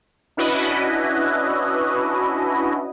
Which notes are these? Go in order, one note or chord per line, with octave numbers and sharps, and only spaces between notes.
C#4 D4 E4 F#4 B4 D#5